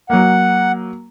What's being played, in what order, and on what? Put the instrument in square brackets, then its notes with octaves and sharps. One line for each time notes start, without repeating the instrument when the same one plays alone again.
[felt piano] F#3 A#3 [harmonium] F#5